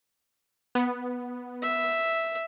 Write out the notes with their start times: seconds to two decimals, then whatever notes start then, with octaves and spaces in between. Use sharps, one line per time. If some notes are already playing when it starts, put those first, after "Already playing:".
0.75 B3
1.63 E5